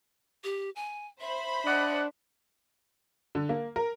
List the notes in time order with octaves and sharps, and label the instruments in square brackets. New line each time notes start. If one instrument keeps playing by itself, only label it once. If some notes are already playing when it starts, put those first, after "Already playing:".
[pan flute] G4
G#5
[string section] C5 B5 [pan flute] E5
[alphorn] D4 [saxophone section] D5 D#5 F#5
[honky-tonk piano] D3
A#3
A#4